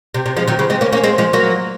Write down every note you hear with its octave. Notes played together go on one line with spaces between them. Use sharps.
C3
C3
F3 G#3
D#3 F#3
C#3 F3
G#3 C4
A#3 C#4
A#3 C#4
G#3 C4
F3 G#3
F#3 A#3